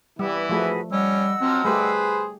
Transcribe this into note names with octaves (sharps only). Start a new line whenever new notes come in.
E3 G3 B3 E4 B4
F3 A3 F#4 G#4 B4
G3 C#4 D#5 F#5 E6
F3 F#3 C4
G3 A3 G4 G#4 B4 C5